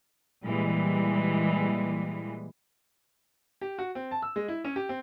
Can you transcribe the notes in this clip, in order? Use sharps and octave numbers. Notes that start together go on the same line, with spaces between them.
A#2 E3 G3 G#3
G4
F#4
C4
A5
E6
G#3
E4
C#4
G4
C4